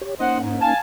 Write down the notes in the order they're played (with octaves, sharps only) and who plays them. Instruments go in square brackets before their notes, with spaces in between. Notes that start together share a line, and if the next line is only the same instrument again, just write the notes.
[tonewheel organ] G4 C#5
[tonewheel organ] A#3 C#4 D#4 [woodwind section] C5 D#5 F#5
[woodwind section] G#2
F5 G#5 A5